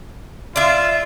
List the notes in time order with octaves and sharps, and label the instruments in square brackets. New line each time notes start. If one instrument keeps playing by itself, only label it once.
[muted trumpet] F4 [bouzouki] D5 E5